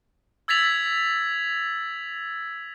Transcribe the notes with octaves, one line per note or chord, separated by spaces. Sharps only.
E6 G#6 A6 B6 F7 F#7